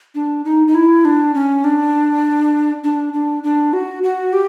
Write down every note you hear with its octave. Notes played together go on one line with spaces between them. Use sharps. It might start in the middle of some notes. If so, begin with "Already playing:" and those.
D4
D#4
D#4
E4
D4
C#4
D4
D4
D4
D4
F#4
F#4
G4